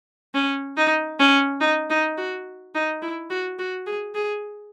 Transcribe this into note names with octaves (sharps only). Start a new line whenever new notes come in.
C#4
D#4
C#4
D#4
D#4
F#4
D#4
E4
F#4
F#4
G#4
G#4